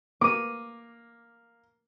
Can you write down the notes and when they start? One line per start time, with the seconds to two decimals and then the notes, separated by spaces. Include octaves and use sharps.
0.21 A#3 D6 D#7